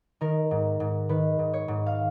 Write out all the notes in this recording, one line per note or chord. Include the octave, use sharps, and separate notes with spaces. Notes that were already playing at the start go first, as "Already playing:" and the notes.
D#3 A#4
G#2
G#2
D#3 B4
G#2
C#5
G#2
F5